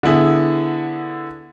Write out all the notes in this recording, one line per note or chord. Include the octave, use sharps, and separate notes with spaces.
D3 B3 E4 G#4